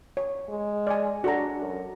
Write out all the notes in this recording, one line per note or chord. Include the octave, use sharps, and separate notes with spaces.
C#5
G#3
D5 G#5
D4 F#4 A4 A#5
F#2